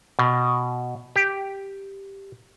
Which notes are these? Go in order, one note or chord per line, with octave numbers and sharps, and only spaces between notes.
B2
G4